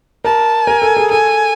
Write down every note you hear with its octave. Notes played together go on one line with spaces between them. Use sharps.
A#4 A5
A#4 G#5
A4
G#4
A4 G#5